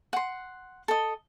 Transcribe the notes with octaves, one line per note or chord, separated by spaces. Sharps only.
F#5 C6
A4 D#5